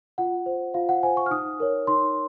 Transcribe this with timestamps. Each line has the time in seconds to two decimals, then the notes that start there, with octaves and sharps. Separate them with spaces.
0.18 F4 F#5
0.46 C5
0.74 F4 F5
0.89 F#5
1.03 C5 G#5
1.17 C#6
1.26 F6
1.31 D#4 D#6
1.60 A#4 C#5
1.87 D#4 C6